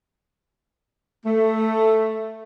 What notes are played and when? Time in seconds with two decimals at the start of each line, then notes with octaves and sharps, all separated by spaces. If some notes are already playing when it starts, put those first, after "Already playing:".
1.25 A3